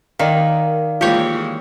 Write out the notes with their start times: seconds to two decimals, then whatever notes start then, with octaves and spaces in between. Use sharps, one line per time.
0.19 D#3 A#4 D5 F5
1.01 E3 G#3 A#3 F4 G4 C#5